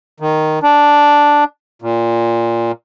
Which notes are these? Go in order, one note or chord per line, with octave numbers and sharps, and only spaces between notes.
D#3
D4
A#2